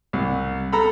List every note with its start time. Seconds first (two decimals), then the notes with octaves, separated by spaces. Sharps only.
0.13 C2
0.73 A4 A#5 B5